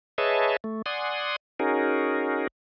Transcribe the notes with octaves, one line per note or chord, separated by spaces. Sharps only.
G#4 B4 C#5 D#5 E5 A5
A3
D5 F#5 G#5 C6 D#6
C#4 D#4 F#4 G#4 A#4